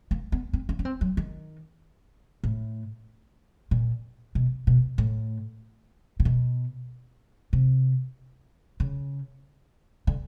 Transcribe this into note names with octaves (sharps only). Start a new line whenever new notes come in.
A#3
B3
C4
C#4
C#4
C4
F#3
D#3
A2
A#2
B2
B2
A2
C3
B2
C3
C#3
D3